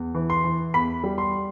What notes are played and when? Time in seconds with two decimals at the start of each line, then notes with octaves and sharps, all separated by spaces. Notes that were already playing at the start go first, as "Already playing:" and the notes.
Already playing: E2
0.15 E3
0.30 C6
0.44 E3
0.74 E2 B5
1.04 G3
1.18 C6